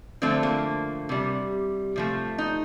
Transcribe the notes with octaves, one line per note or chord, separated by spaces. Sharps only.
D3 F3 A3 C4
A#3
C3 G3
C3 F3 A3
D#4